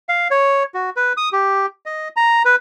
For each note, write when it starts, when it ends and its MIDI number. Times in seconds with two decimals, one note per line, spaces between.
0.09 0.28 77
0.31 0.63 73
0.74 0.90 66
0.96 1.13 71
1.17 1.29 87
1.33 1.66 67
1.86 2.08 75
2.16 2.43 82
2.45 2.56 71